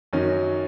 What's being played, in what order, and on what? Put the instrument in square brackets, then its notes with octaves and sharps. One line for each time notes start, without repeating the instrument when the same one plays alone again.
[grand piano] F#2 D#3 F#3 C#4